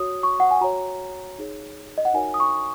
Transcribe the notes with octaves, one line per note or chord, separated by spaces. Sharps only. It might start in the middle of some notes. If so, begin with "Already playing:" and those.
Already playing: F#4 C#5 D#6
C#6
F#5
G#5
F#4 C#5 A#5
D#4 G#4 C#5
D#5
F#5
D#4 F#4 A#4 C#5 G#5
D#6
C#6